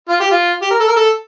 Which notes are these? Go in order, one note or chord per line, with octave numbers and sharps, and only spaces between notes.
F4
G4
F4
G4
A#4
A4
A#4
A4